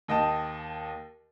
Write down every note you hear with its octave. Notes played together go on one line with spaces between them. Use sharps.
D#2 D#5 G5 A5